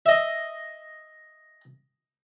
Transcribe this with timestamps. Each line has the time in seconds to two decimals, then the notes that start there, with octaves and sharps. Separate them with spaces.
0.06 D#5 E5